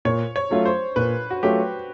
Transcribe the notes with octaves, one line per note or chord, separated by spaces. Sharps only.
A#2 C#5
C#5
F#3 A3 C#4 F4
C5
A#2 B4
F#4
F#3 A3 C#4 F4 G4